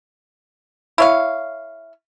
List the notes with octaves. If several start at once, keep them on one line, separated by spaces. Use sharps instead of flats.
E4 C#5 F5